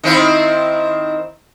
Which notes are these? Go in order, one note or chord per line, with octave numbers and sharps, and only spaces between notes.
D#3 C4 E4